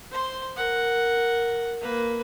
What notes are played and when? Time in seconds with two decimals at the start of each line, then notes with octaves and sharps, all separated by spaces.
0.12 C5 C6
0.57 A#4 F#5
1.81 A#3 B4